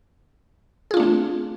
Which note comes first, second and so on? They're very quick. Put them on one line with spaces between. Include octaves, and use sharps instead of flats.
G#4 F4 D4 A3 C4